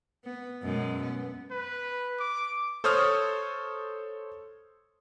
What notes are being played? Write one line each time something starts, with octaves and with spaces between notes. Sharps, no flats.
B3
F#2 B2 G#3
B3
B4
D6
A4 C5 C#5 D#6 F6